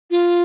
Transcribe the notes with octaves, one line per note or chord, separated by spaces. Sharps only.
F4